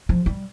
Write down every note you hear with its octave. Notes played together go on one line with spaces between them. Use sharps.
F3
G3